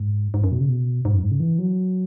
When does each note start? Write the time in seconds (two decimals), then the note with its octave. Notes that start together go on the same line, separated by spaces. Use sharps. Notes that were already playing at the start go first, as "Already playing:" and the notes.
Already playing: G#2
0.34 G#2
0.44 F#2
0.52 B2
0.60 C#3
0.69 B2
1.05 G#2
1.14 F#2
1.22 G#2
1.31 C#3
1.40 E3
1.59 F#3